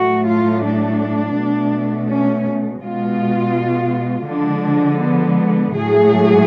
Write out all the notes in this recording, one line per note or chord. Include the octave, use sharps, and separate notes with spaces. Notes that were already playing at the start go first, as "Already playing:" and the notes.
Already playing: A2 F#3 A3 F#4
F4
D4
B2 A3
C#4
B2 G#3 F4
D3 F3 G#3 D4
B3
A2 F#3 A3 G#4